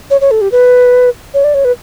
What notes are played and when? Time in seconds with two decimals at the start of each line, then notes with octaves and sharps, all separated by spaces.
0.10 C#5
0.21 C#5
0.31 A4
0.41 G4
0.52 B4
1.34 C#5
1.44 D5
1.54 C#5
1.65 B4